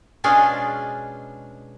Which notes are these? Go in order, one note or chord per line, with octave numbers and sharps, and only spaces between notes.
B2 G#3 C#4 D4 F4 G#4